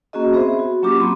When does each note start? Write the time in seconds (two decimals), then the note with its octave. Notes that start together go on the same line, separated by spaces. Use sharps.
0.13 A#3 C#4 F#4 G#4 D#5
0.33 B3 C4 G#4 C5 E5
0.59 F#4
0.82 F#3 A#3 C#4 F4 G4 D6
0.99 A#3 C4 B5 C6